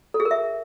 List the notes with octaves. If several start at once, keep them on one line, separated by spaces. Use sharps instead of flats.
A4
G#4
A#4
E5